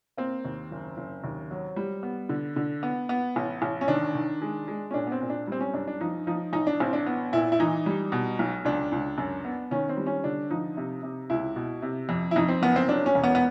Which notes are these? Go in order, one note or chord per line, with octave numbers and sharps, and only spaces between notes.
A#3 C4
D#2
F#1
F#1
D#2
F#3
G3
B3
D3
D3
B3
B3
A1
A1
C#4
D#3 D4
D#3
G#3
G#3
C#4
A#2 D4
B3
C4
A#2
D4
G3 C4
C#4
F#2 D4
D4
F3 D#4
F3 D#4
A1 D#4
D4
A1 C4
D4
B3
A#2 E4
E4
E3 D#4
G3
B2
B1
C#2 D4
C#2
F#2
B3
D#3 C#4
C4
G3
C#4
D3 D4
F3 D#4
C3
C3
C#2 E4
B2
C3
F2
E4
F2 D#4
C4
F#1 B3
C4
F#3 D4
C#4
E1
B3
B3